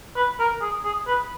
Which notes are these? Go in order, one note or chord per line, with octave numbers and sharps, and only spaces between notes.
B4
A#4
G#4
G#4
B4